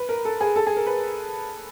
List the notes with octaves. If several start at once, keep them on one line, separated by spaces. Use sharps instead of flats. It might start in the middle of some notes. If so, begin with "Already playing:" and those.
Already playing: B4
A#4
A4
G#4
A4
G#4
A#4
B4